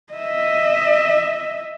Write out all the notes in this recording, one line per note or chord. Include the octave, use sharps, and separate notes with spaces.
D#5 E5